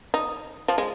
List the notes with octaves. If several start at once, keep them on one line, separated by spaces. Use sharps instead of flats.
D#4
F3
G#3